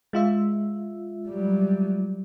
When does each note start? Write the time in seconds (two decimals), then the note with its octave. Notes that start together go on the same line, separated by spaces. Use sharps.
0.13 G#3 F4 E5
1.28 F#3 G3